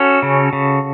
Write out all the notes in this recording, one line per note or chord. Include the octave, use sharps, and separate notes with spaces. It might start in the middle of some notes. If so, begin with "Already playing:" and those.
Already playing: C#4 F#4 A4
C#3
C#3